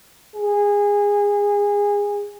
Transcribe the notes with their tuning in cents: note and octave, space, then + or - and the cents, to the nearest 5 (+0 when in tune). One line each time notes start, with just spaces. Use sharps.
G#4 -25